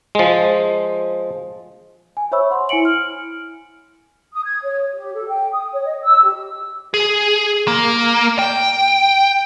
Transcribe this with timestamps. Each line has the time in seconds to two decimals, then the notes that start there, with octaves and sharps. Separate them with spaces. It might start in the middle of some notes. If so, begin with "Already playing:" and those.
0.15 F3 G#3
2.17 G#5
2.32 C5 C#5 E5 B5 C#6 E6
2.51 F#5 C6
2.69 E4 G#5 C#7 D7 F#7
2.85 F6
4.33 D#6
4.45 G#6
4.62 C#5
4.94 G4
5.14 A4
5.29 G5
5.52 D#6
5.73 C#5
5.85 D#5
6.02 E6
6.23 G4
6.94 G#4
7.68 A#3
8.39 G5